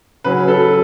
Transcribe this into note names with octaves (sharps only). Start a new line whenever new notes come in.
C#3 F#3 C#4 B4
A4